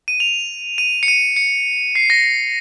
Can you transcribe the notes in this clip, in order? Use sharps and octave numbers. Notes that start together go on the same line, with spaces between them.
D#7
F7
D#7
C#7
D#7
C#7
C7
A#6